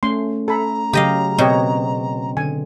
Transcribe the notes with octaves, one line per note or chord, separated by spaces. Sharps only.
A3 C#4 C6
A4 A#5 B5
C#3 F#3 G4 D#5 F5
B2 C4 G4 C#5 D#5
D3 G#5